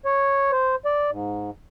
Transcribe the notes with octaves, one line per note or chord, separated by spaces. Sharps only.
C#5
C5
D5
G#2